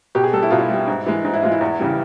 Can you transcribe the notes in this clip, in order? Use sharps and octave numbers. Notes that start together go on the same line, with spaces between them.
B2 G4
G#4
G3 A4
E4
B2 F4
E4
G3
G#2
E3 G#3
G#2
E4
E3 G#3 F4
E4
E2
C#3 E3 G3